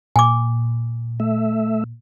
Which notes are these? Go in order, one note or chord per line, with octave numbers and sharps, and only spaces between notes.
A#2 G#5 D6
A3 E5